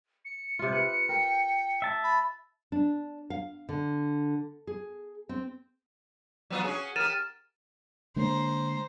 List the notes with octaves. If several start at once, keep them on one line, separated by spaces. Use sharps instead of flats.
C#7
C3 F4
B4
A#4 G5
E5 A5
B5
D4
F5
D3
G#4
C4
F#3 B3 F4
C#4 F#4 G#4
G4 A#4 F6 A6 D#7 E7
D3 G#3 A#3 C5 A#5